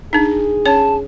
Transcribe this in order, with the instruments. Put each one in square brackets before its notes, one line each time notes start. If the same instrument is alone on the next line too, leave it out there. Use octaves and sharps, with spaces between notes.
[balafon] D4 D#4 [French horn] G#4
[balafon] C#4 C#5 [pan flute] A5